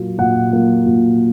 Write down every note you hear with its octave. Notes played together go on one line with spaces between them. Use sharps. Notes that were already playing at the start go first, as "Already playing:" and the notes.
Already playing: A#2 F#3 A#3 F4
A#2 F#5
F#3 A#3 F4
A#2